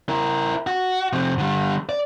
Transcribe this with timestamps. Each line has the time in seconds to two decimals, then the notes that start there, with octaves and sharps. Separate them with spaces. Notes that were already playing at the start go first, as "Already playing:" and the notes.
0.09 E4 A#4
0.67 F#4
1.13 F2 C3
1.38 D3 G3
1.89 D5